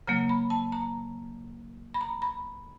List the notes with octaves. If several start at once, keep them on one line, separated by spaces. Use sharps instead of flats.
C#3 F#3 A#3 A#5
B5
A5
A#5
B5
A#5
B5